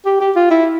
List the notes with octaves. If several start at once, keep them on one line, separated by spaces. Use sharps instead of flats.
G4
G4
F4
E4